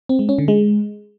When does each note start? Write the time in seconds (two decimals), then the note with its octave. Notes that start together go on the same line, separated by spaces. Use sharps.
0.09 C4
0.19 G#3
0.29 C#4
0.38 D3
0.48 G#3